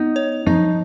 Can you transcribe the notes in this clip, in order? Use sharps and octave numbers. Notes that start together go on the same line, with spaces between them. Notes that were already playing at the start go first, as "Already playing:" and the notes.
Already playing: B3 D#4
C#5
F3 D#4